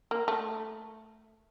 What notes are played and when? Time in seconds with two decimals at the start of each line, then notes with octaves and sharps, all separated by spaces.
0.11 A#3
0.28 A3